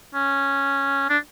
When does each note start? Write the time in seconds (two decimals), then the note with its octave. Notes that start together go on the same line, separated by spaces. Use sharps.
0.14 C#4
1.10 D4